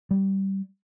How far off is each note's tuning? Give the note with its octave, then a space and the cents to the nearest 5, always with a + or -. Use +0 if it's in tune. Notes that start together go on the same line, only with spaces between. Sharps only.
G3 -15